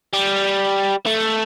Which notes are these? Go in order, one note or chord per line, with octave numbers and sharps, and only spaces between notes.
G3
A3